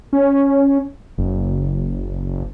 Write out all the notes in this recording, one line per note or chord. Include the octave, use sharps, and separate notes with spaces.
C#4
F#1